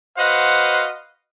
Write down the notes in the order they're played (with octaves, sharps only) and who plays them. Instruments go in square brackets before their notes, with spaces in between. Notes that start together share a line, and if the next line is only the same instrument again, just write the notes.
[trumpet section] F#4 B4 C5 D#5 F5 F#5